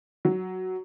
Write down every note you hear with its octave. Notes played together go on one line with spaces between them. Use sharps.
F#3